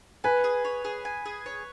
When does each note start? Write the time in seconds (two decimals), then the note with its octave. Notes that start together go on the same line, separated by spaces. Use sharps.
0.24 B4 G#5
0.44 G#4
0.65 C#5
0.85 G#4
1.05 G#5
1.26 G#4
1.46 C#5